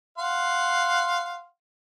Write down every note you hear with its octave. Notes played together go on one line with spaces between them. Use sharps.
F5 F#5 C6